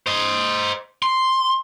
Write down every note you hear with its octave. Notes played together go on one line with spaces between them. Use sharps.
C5 D#5
C6